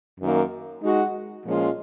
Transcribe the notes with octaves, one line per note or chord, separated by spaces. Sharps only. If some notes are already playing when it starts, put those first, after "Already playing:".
F#2 D#3 A#3
G#3 D#4 F#4
A#2 F3 G#3 C#4 F4